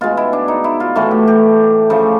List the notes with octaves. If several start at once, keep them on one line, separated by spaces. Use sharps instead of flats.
B2 G#3 F4
E4
D4
D#4
E4
F4
A2 E3 A3 F#4
G4
G4
C#3 F3 A3